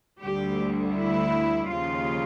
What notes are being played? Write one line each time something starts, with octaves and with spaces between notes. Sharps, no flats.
D2 D3 G3 G4
E4
D#2 C#3 F3 F4